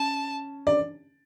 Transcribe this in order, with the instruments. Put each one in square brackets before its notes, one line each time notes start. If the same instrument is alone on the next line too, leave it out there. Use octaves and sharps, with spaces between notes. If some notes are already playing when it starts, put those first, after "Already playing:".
Already playing: [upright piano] C#4 [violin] A5
[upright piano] D5